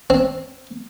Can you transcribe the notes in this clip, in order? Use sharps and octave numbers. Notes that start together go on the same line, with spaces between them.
C4